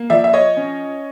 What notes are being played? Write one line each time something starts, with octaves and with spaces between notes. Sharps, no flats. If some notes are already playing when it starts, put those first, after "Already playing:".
Already playing: A#3
F3 D5 E5
E5
C#5 D#5
C#4